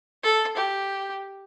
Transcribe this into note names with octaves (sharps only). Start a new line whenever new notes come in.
A4
G4